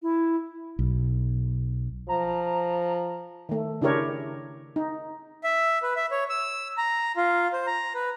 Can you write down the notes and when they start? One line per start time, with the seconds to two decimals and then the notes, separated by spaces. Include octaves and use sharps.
0.02 E4
0.79 B1
2.09 F3 A#5
3.49 D#3 A3
3.81 C#3 D4 E4 G4 A#4 C#5
4.76 D#4
5.44 E5
5.83 B4
5.96 E5
6.11 C#5
6.30 E6
6.78 A#5
7.17 F4
7.53 C5
7.67 A#5
7.94 B4